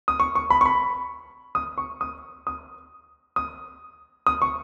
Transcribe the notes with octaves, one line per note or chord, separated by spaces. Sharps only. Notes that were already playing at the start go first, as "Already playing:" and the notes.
D#6
C#6
C#6
B5
C#6
B5
D#6
C#6
D#6
D#6
D#6
D#6
C#6